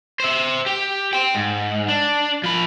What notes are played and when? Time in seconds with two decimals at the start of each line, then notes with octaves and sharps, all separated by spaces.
0.20 C5 E5
0.66 G4
1.13 G5 C6
1.35 G#2
1.88 D4
2.44 F3 B5